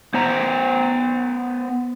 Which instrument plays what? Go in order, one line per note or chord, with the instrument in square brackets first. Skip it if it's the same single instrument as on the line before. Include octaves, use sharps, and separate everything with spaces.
[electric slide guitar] B3 C5 A#5